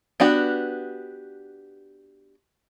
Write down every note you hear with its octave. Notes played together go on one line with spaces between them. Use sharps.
B3 D4 F#4 G4